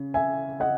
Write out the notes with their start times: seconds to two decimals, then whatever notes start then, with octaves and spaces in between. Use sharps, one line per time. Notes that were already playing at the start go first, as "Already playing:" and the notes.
Already playing: C#3
0.14 E5 G#5
0.60 D#5 F#5